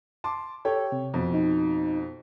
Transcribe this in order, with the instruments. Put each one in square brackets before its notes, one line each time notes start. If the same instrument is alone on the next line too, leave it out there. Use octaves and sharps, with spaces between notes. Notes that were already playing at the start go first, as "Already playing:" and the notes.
[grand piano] A5 C6 D6
[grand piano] G4 C#5 G5 [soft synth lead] A4
[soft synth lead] C3
[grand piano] F2 B2
[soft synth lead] D#4